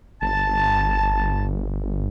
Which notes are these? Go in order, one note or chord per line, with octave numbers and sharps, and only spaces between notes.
G1 A5